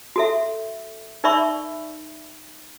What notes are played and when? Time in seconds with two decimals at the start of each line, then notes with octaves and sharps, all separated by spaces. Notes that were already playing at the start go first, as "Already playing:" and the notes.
0.16 F#4 A4 E5
1.24 D#4 A#4 D5 E5 B5 C#6